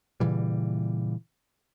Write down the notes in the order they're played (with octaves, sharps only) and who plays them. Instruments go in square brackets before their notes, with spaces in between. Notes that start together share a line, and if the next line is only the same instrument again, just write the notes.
[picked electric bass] A#2 C#3 E3 G3